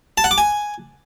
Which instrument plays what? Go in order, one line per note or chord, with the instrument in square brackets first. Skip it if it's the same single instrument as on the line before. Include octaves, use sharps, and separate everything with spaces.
[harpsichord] A5
F#5
D6
G#5